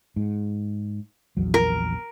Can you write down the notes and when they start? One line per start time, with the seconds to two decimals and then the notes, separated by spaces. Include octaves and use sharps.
0.16 G#2
1.37 A#1 E2 F#3
1.54 A#4